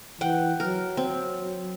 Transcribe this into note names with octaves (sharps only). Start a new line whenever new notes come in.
E3 F#5 G5
F#3 A#4
C4